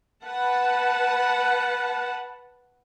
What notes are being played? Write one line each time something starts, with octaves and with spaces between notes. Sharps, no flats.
B4 F#5 A5